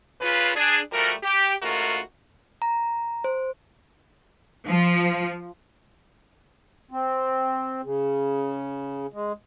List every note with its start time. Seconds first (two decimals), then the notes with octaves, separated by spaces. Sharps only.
0.21 C#3 F4 B4
0.56 D4 G#4
0.92 F3 G3 A3 F#4 A#4
1.23 G4
1.63 G#2 C#3 A3 F4 F#4 A#4
2.62 A#5
3.24 C5
4.68 F3
6.91 C4
7.83 C#3
9.13 G#3